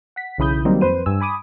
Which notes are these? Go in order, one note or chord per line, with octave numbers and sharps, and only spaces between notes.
F#5 B6
B1 C#3 E3 B5 D#6 G6
D#3 F#3 G3 A#3 C4 D#4
F2 B4 C5 D#7
G2 G#5 E6
G#5 B5 D6 D#6